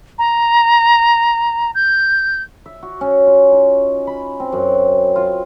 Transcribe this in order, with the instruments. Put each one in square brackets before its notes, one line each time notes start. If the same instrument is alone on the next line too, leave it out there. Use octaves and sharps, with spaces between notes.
[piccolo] A#5
G6
[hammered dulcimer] E5
F#4
C#4
F4
D#4
B5
C4
F#2
F4